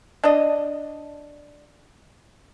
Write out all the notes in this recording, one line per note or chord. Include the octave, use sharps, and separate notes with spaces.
D4 D#5